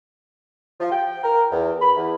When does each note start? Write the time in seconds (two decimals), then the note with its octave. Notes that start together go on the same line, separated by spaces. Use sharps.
0.80 F3
0.92 G5
1.24 A#4
1.51 E2
1.82 B5
1.97 E2